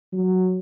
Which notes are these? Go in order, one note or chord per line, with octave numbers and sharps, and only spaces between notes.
F#3